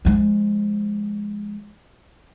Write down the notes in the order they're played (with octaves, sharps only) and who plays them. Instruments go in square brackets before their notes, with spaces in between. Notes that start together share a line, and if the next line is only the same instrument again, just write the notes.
[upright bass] F3 G#3